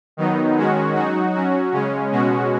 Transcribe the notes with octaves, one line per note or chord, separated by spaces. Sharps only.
D#3 F#3 B3 D#4
D#3 G#3 C#4 F#4
F#3 D#4 F#4
F#3 C#4 F#4
C#3 G#3 C#4
B2 G#3 C#4 F#4